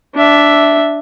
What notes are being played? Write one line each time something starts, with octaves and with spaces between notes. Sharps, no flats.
D4 E5